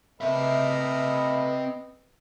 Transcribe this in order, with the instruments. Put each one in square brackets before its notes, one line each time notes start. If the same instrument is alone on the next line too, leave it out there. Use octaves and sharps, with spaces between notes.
[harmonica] A3 A#4 B5 [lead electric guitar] C4 E5 [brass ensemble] B4 D#5